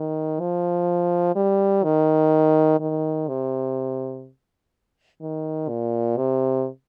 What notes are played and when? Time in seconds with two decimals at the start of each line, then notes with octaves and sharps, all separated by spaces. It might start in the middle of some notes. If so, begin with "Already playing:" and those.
Already playing: D#3
0.40 F3
1.36 G3
1.84 D#3
2.80 D#3
3.28 C3
5.21 D#3
5.69 A#2
6.17 C3